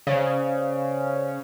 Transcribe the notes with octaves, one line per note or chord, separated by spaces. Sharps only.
C#3 C5 D5 F5